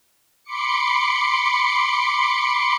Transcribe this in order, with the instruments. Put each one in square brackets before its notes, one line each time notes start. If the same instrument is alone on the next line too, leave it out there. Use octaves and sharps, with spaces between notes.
[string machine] B5 C6 D6 C#7